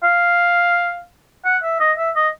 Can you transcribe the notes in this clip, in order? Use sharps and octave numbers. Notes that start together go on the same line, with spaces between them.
F5
F#5
E5
D#5
E5
D#5